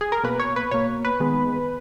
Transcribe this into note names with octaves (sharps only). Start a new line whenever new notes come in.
G#4
A#4
B2 A#3 B4
C#5
B4
B2 A#3 C#5
B4
D#3 G#3 B3